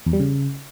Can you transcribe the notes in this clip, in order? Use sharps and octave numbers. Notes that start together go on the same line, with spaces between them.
E2
G3
C#3